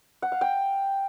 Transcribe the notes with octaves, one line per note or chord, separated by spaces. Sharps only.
F#5
F5
G5